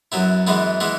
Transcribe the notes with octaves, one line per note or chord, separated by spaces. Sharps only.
F#2 F#3 B3 E4
F#2 E3 G#3 B3 E4
E3 G#3 B3 E4